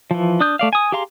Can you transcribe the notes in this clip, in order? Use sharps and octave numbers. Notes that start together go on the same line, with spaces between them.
E3 F3
D4 D#6 G6
A3 D5 F5
G#5 D#6
G4 G#4 F5 A#5 C6